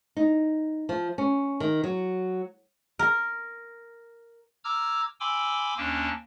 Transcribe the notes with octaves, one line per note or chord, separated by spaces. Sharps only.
D#4
F3
C#4
D#3
F#3
A#4
A#5 D6 E6 F6 G#6
G5 G#5 B5 C6 D6 E6
D#2 A#3 C#4 D4 G5 A5